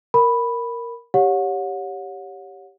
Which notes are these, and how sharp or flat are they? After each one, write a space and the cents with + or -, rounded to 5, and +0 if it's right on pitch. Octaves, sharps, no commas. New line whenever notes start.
A#4 +0 B5 +0
G4 +0 C#5 +5 F#5 -35